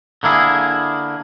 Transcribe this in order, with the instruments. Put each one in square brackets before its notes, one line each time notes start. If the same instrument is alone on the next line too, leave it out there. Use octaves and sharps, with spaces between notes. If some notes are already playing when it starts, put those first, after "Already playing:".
[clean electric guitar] D3 A#3 E4 G#4